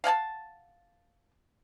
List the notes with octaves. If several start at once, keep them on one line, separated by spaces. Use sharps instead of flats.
F5 F#5 G#5 A5